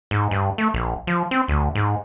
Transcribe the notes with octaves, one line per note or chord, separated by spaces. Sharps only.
G#2
G2
A3
A#1
F3
C4
D2
G#2